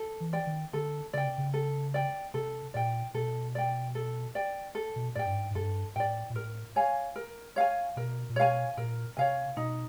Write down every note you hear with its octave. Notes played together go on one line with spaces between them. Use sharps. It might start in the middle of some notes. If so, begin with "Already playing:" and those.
Already playing: A4
E3
D5 G5
D#3
D3 A4
C#3 D5 G5
C3
C#3
A4
D5 G5
C3 A4
A#2 D5 G5
B2 A4
D5 G5
A4
D5 G5
A4
B2
A2 D5 G5
G2
G#2
G#2
G2 A4
A2 D5 G5
A#2
A2 A#4
C#5 F5 G#5
A#4
C#5 F5 G#5
B2 A#4
A#2
B2 C#5 F5 G#5
A#2 A#4
C3 C#5 F5 G#5
B2 D#4